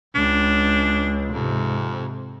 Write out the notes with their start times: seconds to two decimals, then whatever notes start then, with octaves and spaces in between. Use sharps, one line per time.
0.15 C#2 D4
1.34 F2 G#2 C3